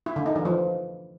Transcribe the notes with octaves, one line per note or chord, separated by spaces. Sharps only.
E4
D3
D#4
E3
F3